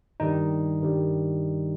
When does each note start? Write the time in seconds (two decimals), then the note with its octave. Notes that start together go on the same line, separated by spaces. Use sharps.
0.20 G2 D#3 G3 D#4
0.82 G2 D#3 G3